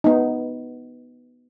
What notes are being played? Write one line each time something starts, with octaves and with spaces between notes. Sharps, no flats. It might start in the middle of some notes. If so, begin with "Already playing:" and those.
B3 D#4